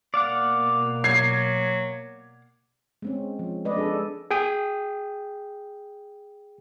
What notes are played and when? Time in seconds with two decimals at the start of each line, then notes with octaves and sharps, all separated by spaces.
0.14 B2 A#3 D5 F5 F#5
1.04 F#3 G#6 C7
3.02 G#3 C4 C#4
3.39 F3
3.65 G#3 B4 D5 D#5
3.77 D4 G#4 A4
4.31 G#4 G5 D#6